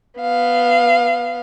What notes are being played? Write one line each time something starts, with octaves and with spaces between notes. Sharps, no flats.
B3 F5